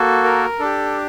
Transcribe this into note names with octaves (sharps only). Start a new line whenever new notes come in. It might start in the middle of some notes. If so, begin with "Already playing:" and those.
Already playing: A#3 F#4 A4
A#4
D4 G4 A4